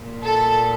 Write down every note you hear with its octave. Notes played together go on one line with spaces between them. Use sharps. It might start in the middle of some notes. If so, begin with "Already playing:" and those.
Already playing: A#2
A4